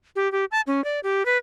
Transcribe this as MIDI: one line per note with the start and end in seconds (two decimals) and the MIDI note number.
0.16 0.31 67
0.32 0.45 67
0.52 0.61 81
0.67 0.84 61
0.84 1.00 74
1.03 1.25 67
1.26 1.38 71